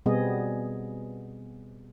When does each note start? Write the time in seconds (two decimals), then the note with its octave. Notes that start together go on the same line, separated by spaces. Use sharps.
0.06 B2 G3 B3 C4 G#4 D#5